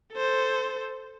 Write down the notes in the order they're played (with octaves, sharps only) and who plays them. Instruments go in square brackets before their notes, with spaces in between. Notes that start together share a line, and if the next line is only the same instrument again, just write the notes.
[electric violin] A4 C5